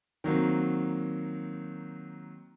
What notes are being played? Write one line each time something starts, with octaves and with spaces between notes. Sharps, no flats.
D#3 F#3 A#3 C4